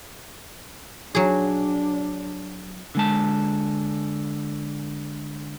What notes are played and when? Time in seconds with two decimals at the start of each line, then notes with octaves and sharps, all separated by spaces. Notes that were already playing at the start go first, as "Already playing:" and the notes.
1.15 F#3 D4 G#4
2.95 D3 G#3 A5